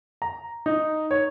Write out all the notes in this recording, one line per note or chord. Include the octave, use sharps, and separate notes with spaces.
A#5
D#4
C#5